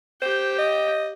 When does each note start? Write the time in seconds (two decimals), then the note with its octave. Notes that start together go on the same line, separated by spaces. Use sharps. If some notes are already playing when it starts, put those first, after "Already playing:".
0.22 G4 C5 G5
0.58 D#5